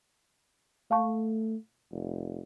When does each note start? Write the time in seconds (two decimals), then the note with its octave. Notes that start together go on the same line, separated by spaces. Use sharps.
0.91 A3 F5 A5 C#6
1.92 F1